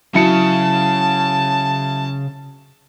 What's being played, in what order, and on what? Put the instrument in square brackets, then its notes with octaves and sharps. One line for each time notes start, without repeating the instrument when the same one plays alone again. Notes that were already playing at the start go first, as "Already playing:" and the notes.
[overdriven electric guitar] C#3 [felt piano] F#3 E4 C#7 [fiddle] A5